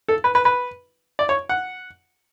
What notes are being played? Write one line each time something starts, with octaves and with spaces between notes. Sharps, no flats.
A4
B4
B4
B4
D5
C#5
F#5